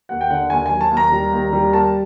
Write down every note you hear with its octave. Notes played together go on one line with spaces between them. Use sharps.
D#2 F#5
G5
D3 F#5
D#2 G#5
F#3 G#5
A5
D#2
A#5
G3
D#2
G3
A#3 A5